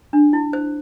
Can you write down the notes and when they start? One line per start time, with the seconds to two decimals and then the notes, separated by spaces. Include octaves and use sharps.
0.13 D4
0.33 E4
0.53 C5